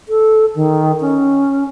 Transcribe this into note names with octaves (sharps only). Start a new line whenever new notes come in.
A4
D#3
C#4